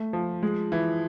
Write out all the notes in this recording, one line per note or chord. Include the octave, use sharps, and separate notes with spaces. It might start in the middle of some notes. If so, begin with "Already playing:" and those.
Already playing: A3
F3
G#3
E3